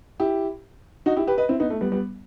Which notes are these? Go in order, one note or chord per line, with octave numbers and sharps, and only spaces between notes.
E4 G4
D#4 F#4
E4 G4
G4 B4
B4 D#5
C4 E4
B3 D#4
A3
G3 B3
G3 B3